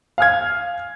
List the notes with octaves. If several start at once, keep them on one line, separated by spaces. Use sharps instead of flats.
F5 G#5 F6 G#6